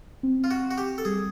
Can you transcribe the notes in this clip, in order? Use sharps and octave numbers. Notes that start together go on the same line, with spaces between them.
C4
F4
F#4
C4
F#4
G4
A4
G3 G#4